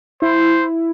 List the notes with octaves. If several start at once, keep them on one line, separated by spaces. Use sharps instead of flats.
E4 C5